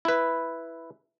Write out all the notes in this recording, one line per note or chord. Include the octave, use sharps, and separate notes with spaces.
E4 B4